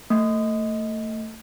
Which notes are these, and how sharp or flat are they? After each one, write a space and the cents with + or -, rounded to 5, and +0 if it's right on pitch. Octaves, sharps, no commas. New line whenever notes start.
A3 +30